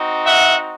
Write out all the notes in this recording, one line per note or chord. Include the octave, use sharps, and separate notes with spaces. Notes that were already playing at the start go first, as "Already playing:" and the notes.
Already playing: C4 D#4 F#4
E5 F#5